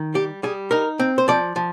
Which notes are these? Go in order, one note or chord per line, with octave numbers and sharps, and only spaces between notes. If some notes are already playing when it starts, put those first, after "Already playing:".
Already playing: D#3
G3 G4
G3 G#4
D#4 A#4
C4
C5
F3 D5
F3